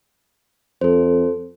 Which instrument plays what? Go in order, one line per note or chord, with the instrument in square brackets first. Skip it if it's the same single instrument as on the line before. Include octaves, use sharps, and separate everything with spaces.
[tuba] F2 [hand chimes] A4 C5